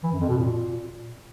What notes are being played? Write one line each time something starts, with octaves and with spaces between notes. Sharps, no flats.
E3
F#2
F2
B2
A#2